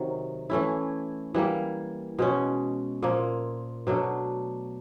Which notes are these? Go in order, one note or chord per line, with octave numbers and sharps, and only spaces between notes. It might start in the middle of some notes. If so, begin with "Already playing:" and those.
Already playing: C3 D#3 F#3
E3 A3 C#4 E4
E3 G3 A#3
B2 G#3 C#4
A#2 F3 A#3
B2 F#3 A3 D4